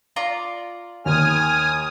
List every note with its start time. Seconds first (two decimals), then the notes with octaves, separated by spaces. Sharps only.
0.16 F4 D5 A#5
1.06 D#2 G#5 D#6 F6